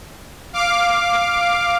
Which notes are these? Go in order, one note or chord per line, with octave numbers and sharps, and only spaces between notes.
F5 D6